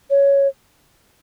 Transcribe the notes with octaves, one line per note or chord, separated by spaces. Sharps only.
C#5